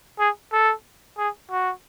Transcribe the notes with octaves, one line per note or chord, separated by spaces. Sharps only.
G#4
A4
G#4
F#4